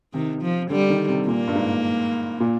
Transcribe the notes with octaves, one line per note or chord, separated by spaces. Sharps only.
C3 D#3
F3
D3 G3
D#3
C3
A#2 A#3
G2
G#2
A#2